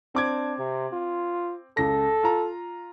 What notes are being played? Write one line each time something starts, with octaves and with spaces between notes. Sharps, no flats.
C4 D4 D6 G#6
C3
F4
C#2 A4 A#6
F4 A#5